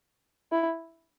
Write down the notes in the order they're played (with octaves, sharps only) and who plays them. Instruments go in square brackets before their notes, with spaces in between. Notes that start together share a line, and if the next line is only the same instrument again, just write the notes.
[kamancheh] E4